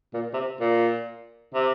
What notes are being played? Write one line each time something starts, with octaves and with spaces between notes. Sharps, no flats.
A#2
C3
A#2
C3